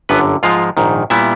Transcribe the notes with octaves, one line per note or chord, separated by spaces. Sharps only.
G1 F#2 D3 B3 B4
G#2 F3 G#3 F4 F5
A#1 G#2 D#3
A#2 G3 B3 E4 E5